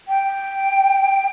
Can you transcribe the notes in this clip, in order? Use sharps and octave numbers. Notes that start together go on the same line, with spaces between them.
G5